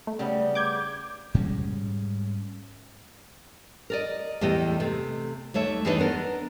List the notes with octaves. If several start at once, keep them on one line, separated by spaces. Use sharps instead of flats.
A3
C#3 G3 B3
D6 G6 G#6
G#2 G3 G#3 C#4
A#4 D5 D#5
E2 A2 E4 G4 D#5
C3 A3
D#2 A3 C#5 E5
E2 E3 D4 D#4 B4 D#5
B3 D4 A#4